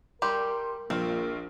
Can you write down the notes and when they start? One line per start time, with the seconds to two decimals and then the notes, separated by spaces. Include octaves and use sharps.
0.22 G3 G4 A#4 C6
0.90 A#1 A#3 C4 F4